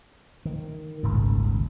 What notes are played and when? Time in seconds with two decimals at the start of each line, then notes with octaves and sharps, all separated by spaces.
0.45 D#3
1.03 D#1 G#1 C#2 G#2